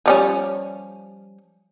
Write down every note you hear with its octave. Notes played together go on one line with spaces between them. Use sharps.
F3 G3 C#4